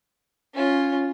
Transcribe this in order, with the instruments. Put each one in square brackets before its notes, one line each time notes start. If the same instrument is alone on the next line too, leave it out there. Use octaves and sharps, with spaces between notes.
[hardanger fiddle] C#4 F4